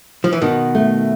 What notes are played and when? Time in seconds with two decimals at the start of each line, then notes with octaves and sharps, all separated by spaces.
0.24 F3
0.33 E3
0.41 B2 D#3
0.75 A3